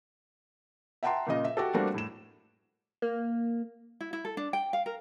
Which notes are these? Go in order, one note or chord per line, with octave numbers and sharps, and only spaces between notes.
E5 F#5 G5 A5 A#5 C6
A#2 C#3 D#5
E5
F#4 G4 A4
G3 A3 A#3 C4 D4 F#4
A2 E7
A#3
E4
E4
A4
D4
G5
F5
A#4